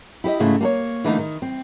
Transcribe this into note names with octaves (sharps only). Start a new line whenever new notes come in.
E4 G4 C5 D#5
G#2 C#3 A3 E4
A#3 A4 C#5
D3 E3 A3 A#3 C4 D#4
D#3
C4